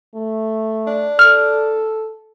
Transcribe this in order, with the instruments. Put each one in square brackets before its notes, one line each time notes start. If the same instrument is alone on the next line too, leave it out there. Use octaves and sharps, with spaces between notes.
[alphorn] A3
[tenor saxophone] D4
[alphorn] A4 [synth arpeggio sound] F6